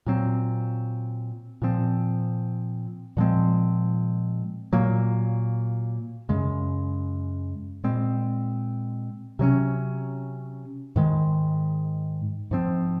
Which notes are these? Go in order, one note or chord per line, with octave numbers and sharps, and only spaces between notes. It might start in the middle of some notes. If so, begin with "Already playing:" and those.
A#2 F#3 C4
A#2 F3 C4
A#2 F3 G#3 C4
A#2 F#3 A#3
F#2 C#3 G#3
A#2 G#3 C4
C3 F#3 A#3 C#4
G#2 D#3 G#3
G#2 F3 C4